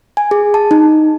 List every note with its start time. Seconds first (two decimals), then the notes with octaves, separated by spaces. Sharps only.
0.17 G#5
0.31 G#4
0.54 A5
0.71 D#4